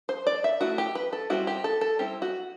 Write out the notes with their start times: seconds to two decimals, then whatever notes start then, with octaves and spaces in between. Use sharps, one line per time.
0.09 C5
0.27 D5
0.44 E5
0.61 A3 E4 F#4
0.78 G4
0.95 B4
1.13 A4
1.30 G3 C4 E4 F#4
1.47 G4
1.64 A4
1.81 A4
1.99 G3 C4 E4 G4
2.22 F#4